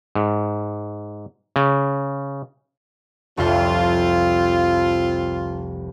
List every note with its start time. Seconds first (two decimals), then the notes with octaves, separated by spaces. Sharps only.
0.15 G#2
1.56 C#3
3.37 F1 C2 F2 C4 F4